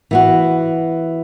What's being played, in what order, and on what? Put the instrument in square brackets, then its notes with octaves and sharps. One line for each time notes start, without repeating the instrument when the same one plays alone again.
[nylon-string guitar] E3 B3 F#4